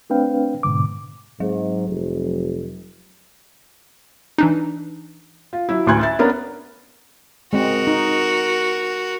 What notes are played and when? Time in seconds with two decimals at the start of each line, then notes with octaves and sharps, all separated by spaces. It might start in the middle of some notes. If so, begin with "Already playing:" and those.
0.10 A3 C4 D4 B4 F5 G5
0.63 G#2 B2 D3 D6
1.40 G#2 F#3
1.88 F1
4.38 E3 D4 D#4
5.53 F4
5.69 F#3 E4
5.87 A1 D2 C6 F#6 G#6
6.01 E5 A6
6.19 A#3 B3 C#4 D4 A#4
7.53 G#3 C4 F#4 A#4
7.87 D#4